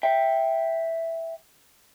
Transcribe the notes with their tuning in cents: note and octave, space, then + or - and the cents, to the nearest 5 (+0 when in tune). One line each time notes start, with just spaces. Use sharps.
E5 +0 G5 +5